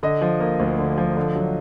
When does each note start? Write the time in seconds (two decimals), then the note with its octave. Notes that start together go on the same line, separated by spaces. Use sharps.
0.03 D3 D#5
0.22 F3
0.40 A#3
0.60 D2
0.79 D3
0.98 F3
1.17 D3
1.36 F#3